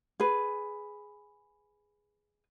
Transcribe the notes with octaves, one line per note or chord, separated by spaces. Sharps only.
G#4 B4